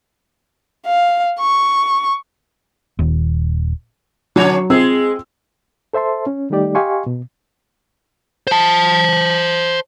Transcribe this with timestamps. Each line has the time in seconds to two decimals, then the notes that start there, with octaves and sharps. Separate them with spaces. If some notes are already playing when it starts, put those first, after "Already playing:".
0.86 F5
1.39 C#6
2.99 D#1
4.36 D3 F#3 C#4 C#5
4.70 G#3 C4 F4 G#4 E6
5.94 A4 C5 E5 A5 C6
6.27 C#4
6.50 D#3 G3 A3 D#4 G4 D5
6.75 G4 D#5 F5 G#5 C6 C#6
7.07 B2
8.47 C5 A5